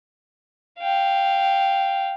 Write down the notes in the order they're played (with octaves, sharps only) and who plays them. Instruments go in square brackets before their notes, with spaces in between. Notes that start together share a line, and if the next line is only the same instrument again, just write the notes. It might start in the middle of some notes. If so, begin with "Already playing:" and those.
[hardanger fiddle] F5 G5